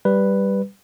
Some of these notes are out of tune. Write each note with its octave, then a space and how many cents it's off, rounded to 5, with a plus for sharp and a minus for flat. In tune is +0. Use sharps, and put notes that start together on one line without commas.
G3 +0 B4 +0